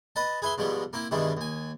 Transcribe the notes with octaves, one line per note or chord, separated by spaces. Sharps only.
B4 D#5 A5
G#4 B4 E5 C6
G#2 B2 F3 G3 G#3
A#3 C4 E4
G2 B2 D#3 E3 G3 G#3
D#2 G#5